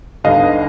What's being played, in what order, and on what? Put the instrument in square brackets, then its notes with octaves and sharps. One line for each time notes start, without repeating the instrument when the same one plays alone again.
[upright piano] D#2 D3 G3 B3 D4 D#5 F5